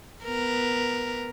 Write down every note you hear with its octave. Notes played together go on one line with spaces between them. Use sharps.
B3 A#4